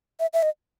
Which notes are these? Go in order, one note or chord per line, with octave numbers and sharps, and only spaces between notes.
E5
E5
D#5